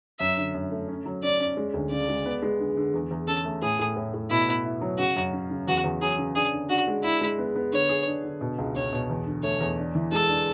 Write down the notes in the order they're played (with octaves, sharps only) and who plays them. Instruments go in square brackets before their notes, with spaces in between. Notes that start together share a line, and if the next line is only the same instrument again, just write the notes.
[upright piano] F#2 [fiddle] E5
[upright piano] D3
F#2
A3
C#4
F#3
[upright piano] C#4 [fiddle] D5
[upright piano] C#4
G#3
D2
[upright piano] C#3 [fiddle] D5
[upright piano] G#3
B3
G#3
D3
D3
E2
E2
[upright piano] C#4 [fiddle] A4
[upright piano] A3
[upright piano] A2 [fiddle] G#4
[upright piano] A2
A2
A2
[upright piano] B2 [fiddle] E4
[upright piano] B3
E4
F#3
[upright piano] C#3 [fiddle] F#4
[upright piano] F#2
C#4
C#3
[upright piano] E2 [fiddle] F#4
[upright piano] E2
[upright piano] F#3 [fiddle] G#4
[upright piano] C#3
[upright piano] D4 [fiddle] G#4
[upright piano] D3
[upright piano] D4 [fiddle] F#4
[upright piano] G#3
[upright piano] D4 [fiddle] E4
[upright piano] G#3
B3
B3
[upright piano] D3 [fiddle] C#5
[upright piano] G#4
D4
D3
B2
C#2
[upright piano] C#2 [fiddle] C#5
[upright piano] B2
E2
D3
[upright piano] A3 [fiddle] C#5
[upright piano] E2
D4
E3
[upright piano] G#3 [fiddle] A4
[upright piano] D4